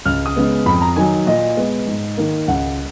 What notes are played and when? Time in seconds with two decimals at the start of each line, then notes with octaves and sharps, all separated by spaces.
0.05 C#2 F6
0.26 D#6
0.36 C#3 G#3 B3
0.66 F2 B5
0.82 A#5
0.96 D#3 F#3 G#5
1.27 A#2 D#5
1.57 G#3 B3
1.87 G#2
2.18 D#3 A#3
2.48 C#2 F#5